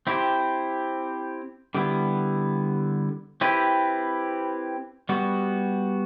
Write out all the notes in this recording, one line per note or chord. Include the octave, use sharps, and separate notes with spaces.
C4 E4 G4 C5
D3 G3 B3 E4
C4 E4 G4 B4
G3 B3 F#4